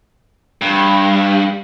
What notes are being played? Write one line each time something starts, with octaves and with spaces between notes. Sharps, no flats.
G2